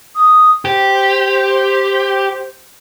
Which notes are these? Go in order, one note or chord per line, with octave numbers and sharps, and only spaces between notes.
D#6
G4 C5